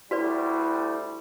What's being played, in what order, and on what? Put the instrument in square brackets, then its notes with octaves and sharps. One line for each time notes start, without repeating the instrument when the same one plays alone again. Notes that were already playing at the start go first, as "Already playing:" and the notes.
[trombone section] D2 G3 [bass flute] E4 [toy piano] F#4 B4 D5